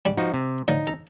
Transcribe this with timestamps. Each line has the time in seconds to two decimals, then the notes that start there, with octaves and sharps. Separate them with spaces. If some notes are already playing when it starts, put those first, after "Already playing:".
0.05 G#2 G3 D4
0.17 F3 D#4 F#4
0.34 C3
0.68 A2 D3 F3 D#4
0.87 A4 A#5